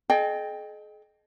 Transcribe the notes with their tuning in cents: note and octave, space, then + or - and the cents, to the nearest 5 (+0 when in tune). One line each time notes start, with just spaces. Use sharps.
G#4 +45 D#5 -20 G5 +10